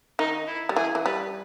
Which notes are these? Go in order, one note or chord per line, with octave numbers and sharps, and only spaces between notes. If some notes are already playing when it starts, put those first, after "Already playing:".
D#3 D#4
E4
G3
E3 G#4
E3
G3 B4